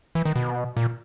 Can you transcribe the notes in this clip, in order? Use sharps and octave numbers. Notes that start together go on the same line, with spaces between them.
E3
D#3
B2
A#2